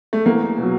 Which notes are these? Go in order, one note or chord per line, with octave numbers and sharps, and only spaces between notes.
A3
E2 A#3
B2 F#3